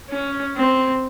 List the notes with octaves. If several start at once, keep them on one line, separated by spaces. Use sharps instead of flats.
C#4
C4